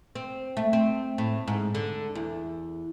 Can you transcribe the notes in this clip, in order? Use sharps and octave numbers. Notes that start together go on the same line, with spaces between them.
C4
A3
C4
A2
G#2
D3
E2